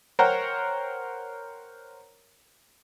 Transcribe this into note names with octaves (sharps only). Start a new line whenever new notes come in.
A#4 C5 C#5 F#5 G5 A#5